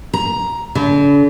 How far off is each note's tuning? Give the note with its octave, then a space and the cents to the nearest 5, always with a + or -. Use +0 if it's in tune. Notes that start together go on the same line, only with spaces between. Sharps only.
A#5 +10
D3 -45